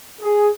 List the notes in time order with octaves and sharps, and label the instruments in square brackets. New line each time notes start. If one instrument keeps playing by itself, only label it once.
[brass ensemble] G#4